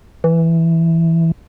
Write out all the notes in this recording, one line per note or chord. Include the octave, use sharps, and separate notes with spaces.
E3